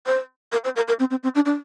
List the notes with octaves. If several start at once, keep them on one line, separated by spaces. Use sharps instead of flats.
C5
A#4
C5
A#4
A#4
C4
C4
C4
D4
D4